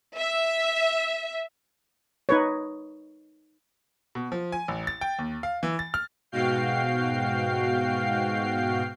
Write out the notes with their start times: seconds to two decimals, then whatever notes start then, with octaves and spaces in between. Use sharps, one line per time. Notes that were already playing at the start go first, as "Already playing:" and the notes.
0.17 E5
2.29 D#4 B4 C#5
4.15 B2
4.32 F3
4.52 G#5
4.68 A1
4.87 A6
5.01 G5
5.19 D#2
5.43 F5
5.63 E3
5.79 A6
5.94 F6
6.32 G#2 B2 F#4 F5 G5 C7